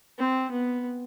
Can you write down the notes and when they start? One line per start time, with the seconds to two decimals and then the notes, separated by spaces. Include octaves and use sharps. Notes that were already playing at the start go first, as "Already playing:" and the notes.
0.19 C4
0.51 B3